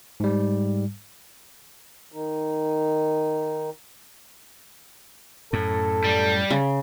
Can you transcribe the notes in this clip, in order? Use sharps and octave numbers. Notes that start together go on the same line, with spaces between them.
G#2 G3
D#3 D#4
F#2 A2 A4
G3
C#3